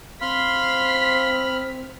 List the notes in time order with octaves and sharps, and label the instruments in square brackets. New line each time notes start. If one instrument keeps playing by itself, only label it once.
[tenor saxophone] C4 [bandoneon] F5 C6 [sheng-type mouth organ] B5 F6 [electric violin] B6